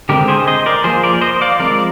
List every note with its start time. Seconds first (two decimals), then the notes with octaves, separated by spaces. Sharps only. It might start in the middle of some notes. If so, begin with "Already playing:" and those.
0.09 D3 G#3 C4 G4 A#4
0.28 G#4 C5
0.48 C5 D#5
0.66 A#4 D5
0.84 F3 A#3 G#4 C5
1.03 A#4 D5
1.21 C5 D#5
1.41 D5 F5
1.59 F3 G#3 C4 A#4 D5